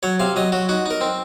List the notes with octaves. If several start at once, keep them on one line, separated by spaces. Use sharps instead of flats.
F#3 C#5
C3 F5
F#3 D#5
F#3 F#4
D#4 F#4
D#4 A#4
C4